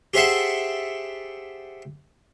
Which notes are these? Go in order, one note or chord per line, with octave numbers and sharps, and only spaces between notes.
G4 G#4 C5 E5 F#5 A5